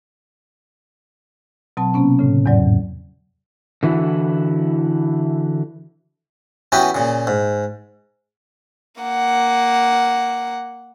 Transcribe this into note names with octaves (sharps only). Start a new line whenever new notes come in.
B2 F#3 C4 A5
C3 A#3 B3 C#4
A2 C#3
E2 G#2 F#3 D5
D3 E3 E4 F#4
E3 B3 C#4 F#4 G4
A#2 C#3
G#2
A#3 F#5